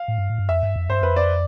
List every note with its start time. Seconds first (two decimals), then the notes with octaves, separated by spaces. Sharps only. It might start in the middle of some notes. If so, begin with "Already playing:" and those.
Already playing: F5
0.08 A2
0.18 G2
0.29 A2
0.38 G2
0.48 F2 E5
0.63 G2
0.76 F2
0.89 G2 C5
1.01 F2 B4
1.16 D5